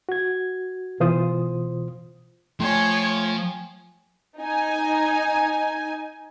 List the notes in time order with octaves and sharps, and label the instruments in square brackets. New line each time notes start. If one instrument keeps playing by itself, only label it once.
[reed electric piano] F#4 G#6
B2 E3 F4 C5 D#6
[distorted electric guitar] F3 [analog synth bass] A3 [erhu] C#5 [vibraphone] G5 G#5
[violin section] D#4 G#5